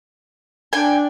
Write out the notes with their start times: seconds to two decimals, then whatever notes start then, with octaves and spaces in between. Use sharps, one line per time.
0.73 D4 G5 G#5